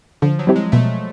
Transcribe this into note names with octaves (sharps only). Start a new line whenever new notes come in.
D3 F3
F#3
G3 C4 E4 G4
G#3
B2 A3